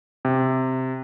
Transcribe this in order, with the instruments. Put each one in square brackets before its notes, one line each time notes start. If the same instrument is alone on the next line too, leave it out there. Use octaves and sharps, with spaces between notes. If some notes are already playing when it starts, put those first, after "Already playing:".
[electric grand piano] C3